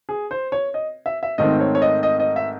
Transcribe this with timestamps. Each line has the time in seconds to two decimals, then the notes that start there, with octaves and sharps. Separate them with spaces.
0.09 G#4
0.31 C5
0.52 C#5
0.74 D#5
1.06 E5
1.23 E5
1.38 G#2 D#3 A3 C4 D#5
1.60 C#5
1.75 C#5
1.82 D#5
2.03 D#5
2.20 D#5
2.36 E5